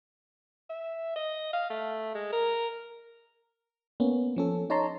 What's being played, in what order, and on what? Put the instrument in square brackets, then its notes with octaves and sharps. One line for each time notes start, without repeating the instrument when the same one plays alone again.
[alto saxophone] E5
D#5
F5
A3
G#3
A#4
[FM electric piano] A#3 B3 C#4
F3 C#4 A4
D#4 C#5 A5 A#5 C6